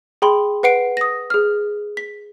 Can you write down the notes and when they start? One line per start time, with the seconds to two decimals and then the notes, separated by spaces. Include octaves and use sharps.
0.22 G#4 G5 B5 C6
0.63 B4 F#5 C7 D7
0.97 D#6 A#6
1.30 G#4 F6
1.97 B6